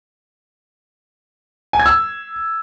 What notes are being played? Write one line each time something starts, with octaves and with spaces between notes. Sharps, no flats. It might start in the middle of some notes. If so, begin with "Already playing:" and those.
G#5
G#6
E6